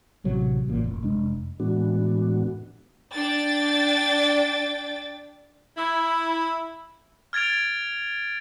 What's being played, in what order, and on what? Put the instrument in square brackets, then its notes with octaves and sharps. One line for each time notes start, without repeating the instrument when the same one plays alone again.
[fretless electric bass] A1 C3 F#3
A1 A#2
F1
F1 G#3 D4
[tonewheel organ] A2 E3 G#3 B3 D4 F#4
[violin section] D4 G5 A6
[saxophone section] E4
[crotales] F6 G#6 A6 D7 F7